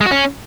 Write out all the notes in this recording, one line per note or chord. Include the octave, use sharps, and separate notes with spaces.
G#3
F#4
C#4